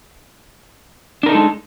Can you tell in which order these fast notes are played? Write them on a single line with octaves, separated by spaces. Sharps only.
D4 A#4 D#4 A4 G#3